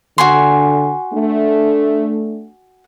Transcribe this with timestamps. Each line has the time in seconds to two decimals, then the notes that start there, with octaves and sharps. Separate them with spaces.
0.18 D3 F#4 G#5 C6
1.14 A3 D4